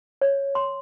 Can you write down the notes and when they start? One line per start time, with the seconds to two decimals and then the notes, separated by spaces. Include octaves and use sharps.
0.21 C#5
0.55 C6